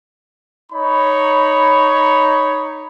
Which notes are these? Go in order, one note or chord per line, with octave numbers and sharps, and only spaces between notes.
D#4 C#5 B5